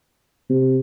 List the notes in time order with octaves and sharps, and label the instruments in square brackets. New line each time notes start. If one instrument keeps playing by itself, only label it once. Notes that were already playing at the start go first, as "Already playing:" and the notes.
[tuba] C3